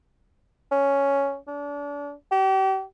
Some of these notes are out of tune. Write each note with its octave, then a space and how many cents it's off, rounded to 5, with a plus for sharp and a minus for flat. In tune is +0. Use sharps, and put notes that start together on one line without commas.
C#4 +5
D4 -35
G4 -35